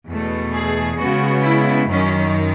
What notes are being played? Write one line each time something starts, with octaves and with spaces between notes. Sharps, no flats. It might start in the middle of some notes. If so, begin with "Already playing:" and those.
E2 B2 A3
G#4
C#3 G#3 B3 F#4
E4
F#2 D#3 F#3 C#4